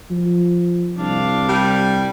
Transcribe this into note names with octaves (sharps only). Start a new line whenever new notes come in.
F3
C2 D4 F5
G3